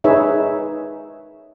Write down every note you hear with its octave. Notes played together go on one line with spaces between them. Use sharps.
D#4 G#4 B4 C#5 E5